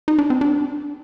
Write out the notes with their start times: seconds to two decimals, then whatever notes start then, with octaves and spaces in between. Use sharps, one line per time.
0.08 D#4
0.19 D4
0.30 C4
0.41 D4